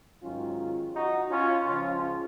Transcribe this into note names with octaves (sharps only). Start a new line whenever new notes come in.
G#2 D#3 F#3 C#4 F4
D#4 F#4
C#4 F4
C#2 C#3 F3 C#4 F4